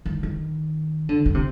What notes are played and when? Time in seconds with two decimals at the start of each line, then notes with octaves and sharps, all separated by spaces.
0.06 D#3
0.23 D#3
1.09 D3
1.26 D3
1.35 C3